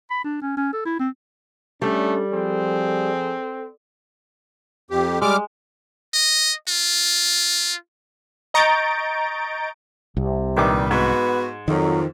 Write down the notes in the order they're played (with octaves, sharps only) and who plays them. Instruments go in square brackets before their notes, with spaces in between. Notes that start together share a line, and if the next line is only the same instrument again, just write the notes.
[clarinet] B5
D4
C#4
C#4
A4
E4
C4
[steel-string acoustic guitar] G3 [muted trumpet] A3 [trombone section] C#4 D4 [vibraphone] A4
[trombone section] F3 G#4 [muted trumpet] C4
[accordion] F2 G4
[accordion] G3 D6 F6 [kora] G#3
[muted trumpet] D#5
F4
[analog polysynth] D#5 A#5 C#6 G6 A6 D7
[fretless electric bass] C2 [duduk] C3
[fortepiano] A#1 D#3 D6 [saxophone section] G2 G3 B4
[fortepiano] G#2 [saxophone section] B3 F#4 [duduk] B4
[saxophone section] F2 [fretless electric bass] D#3 [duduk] F#3